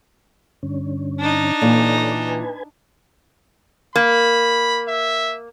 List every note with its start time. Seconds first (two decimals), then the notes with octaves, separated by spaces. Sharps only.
0.63 G2 D3 C#4
1.19 D4 D#4
1.62 A#2 E3 A4 C#5 D5
2.26 B4 G#5
3.96 A#3 B5
4.88 E5